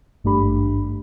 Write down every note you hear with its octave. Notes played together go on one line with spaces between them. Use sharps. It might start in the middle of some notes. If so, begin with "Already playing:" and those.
G#1 G2 A3 D4 G4 B5